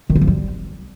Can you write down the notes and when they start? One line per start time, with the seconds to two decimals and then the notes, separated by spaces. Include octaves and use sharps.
0.10 D#3
0.16 D#4
0.21 F3
0.27 G3